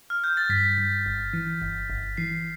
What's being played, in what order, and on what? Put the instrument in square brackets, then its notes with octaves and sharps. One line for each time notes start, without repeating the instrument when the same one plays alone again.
[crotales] F6
G6
A6
[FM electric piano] G2 [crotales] B6
[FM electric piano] G2
G1
E3
G1
G1
[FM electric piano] E3 [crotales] C7